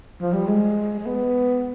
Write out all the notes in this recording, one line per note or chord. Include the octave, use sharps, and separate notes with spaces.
F3
G3
G#3
G#3
B3